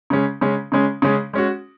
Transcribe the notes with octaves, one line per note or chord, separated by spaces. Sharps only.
C#3 G#3 C#4
C#3 G#3 C#4
C#3 G#3 C#4
C#3 G#3 C#4
G#3 C#4 F#4